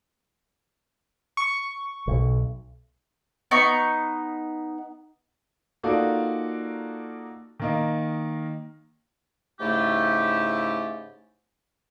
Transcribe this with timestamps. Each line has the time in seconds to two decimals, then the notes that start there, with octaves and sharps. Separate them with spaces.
1.37 C#6
2.08 B1
3.51 B3 D#4 C#6
5.83 A#3 D#4 F4 F#4 A4 D5
7.60 D#3 A#3 D#5
9.60 G#2 C#3 A3 E4 G4